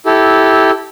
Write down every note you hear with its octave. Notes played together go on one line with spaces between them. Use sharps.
E4 G4 A4